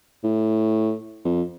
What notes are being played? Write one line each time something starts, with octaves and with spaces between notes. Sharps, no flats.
A2
F2